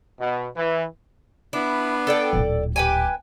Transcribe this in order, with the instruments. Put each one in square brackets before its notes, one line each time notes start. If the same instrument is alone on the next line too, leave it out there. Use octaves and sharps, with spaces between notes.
[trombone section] B2
E3
[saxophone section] B3 D4 [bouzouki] E4
[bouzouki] A4 D5 G5
[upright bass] D1 A#2
[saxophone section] G4 [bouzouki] B4 G5 G#5